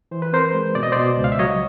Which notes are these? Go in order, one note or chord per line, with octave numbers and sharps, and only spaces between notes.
E3 C5
B4
C4 A#4 C5
G#3
B2 D5
D#5
B2 C5 D5
C#2
F5
E5
F#3 C#5 D#5